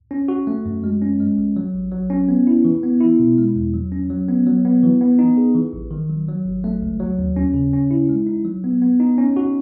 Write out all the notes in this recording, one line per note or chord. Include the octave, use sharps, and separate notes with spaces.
C#4
F#4
A3
F#2
G#3
C#4
G#3
B1
F#3
A1
F#3
C#4
B3
E4
E3
B3
E4
B2
G#3
E2
F#3
C#4
F#3
B3
F#3
B3
E3
B3
D#4
G#4
E3
A1
D#3
F#3
F#3
G#1
A3
C#2
F#3
D#2
C#4
C#3
C#4
E4
G#3
D#4
F#3
B3
B3
D#4
C#4
F#4